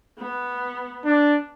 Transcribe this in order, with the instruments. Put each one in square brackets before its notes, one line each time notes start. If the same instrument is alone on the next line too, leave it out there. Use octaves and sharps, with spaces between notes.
[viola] B3
[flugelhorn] D4